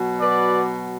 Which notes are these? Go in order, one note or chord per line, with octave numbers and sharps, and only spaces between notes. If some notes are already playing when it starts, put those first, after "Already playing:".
Already playing: B2 F#3
B4 D5